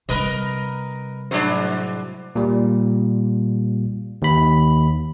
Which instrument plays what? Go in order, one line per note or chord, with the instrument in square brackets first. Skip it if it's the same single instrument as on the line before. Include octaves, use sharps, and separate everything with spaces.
[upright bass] C3 G3 [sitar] A#4 B4 D#5
[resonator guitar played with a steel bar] A2 F#3 C5 [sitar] G#3 D4
[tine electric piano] A#2 G3
D#2 B5